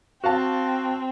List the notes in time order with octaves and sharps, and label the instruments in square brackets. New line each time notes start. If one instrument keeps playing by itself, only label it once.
[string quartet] C4 [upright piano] F#4 F5 A5